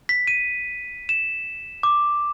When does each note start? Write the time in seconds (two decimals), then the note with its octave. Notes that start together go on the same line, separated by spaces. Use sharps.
0.09 B6
0.27 D#7
1.09 E7
1.83 D6